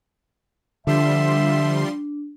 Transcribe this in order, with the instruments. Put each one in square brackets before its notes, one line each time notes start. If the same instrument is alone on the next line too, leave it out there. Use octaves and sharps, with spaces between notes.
[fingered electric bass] D3 [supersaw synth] F3 G3 C6 [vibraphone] D4 [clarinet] E5